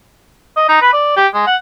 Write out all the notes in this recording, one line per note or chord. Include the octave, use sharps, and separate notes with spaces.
D#5
D#4
B4
D5
G4
G#3
F#5